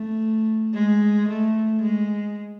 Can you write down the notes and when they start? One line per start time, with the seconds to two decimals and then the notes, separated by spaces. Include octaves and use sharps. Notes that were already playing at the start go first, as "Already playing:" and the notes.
Already playing: A3
0.74 G#3
1.29 A3
1.82 G#3